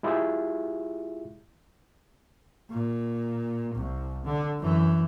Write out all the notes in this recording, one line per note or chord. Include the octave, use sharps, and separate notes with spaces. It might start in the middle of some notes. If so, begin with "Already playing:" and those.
G#3 E4 F4 G4 G#4 E5
A#2
C2
D3
F#2 E3